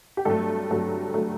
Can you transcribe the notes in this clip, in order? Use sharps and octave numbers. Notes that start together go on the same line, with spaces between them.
G4
G2 F#3 A3 A4
G2 F#3 A3
F#3 A3